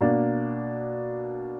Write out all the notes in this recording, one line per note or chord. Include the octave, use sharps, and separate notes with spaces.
B2 A#3 D4